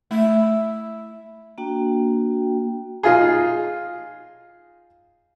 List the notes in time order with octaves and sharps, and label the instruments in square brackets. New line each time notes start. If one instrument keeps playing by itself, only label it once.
[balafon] A3 [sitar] E4
[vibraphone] A#3 D4 F#4 G5
[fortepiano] D#4 F4 G#4